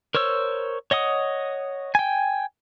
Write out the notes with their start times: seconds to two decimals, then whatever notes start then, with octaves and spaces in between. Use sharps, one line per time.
0.15 A#4 C5 C#5 E6
0.91 C#5 D#5 F#5 D#6
1.95 G5 G#5